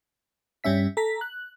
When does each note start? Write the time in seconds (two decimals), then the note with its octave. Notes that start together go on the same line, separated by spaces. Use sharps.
0.64 G2 G3 C#4 E5 B6
0.97 A4 A#5 B6
1.21 F#6